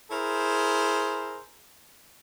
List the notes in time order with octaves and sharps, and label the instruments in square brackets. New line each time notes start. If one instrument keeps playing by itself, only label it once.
[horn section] E4 G#4 A#4 C5